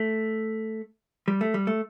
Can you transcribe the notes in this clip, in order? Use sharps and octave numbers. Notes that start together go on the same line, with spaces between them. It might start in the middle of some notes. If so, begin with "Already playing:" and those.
Already playing: A3
G3
A3
G3
A3